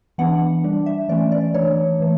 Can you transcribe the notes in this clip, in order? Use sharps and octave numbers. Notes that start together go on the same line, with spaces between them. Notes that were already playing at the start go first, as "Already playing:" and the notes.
E3 B3 D4 F#5
G3 D4
E5
E3 A3 C#4 D5
D5
E3 A3 D4 C#5
E3 A3